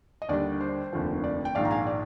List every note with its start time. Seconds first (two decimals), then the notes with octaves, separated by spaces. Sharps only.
0.22 D#5
0.28 D#2 D3 G3 D4 D5
0.61 C5
0.93 F1 D#2 D3 F3
1.24 D5
1.45 G5
1.55 A#1 G#2 D#3 D5 F5
1.65 A#5
1.71 F5 G#5
1.87 D5